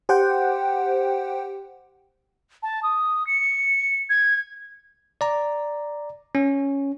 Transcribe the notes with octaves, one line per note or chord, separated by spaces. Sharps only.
G4 C5 F#5 G5
A5
D#6
C#7
G#6
D5 A#5
C#4